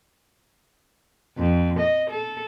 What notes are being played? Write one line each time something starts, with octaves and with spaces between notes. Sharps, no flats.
F2
D#5
A4